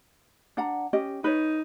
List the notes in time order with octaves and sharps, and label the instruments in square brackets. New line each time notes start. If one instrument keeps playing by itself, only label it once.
[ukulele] D4 F#5 A#5
C#4 G4 D#5
[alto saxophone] D#4 [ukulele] B4 C#5